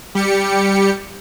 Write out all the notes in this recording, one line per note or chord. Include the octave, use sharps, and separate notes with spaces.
G3 G4 C#7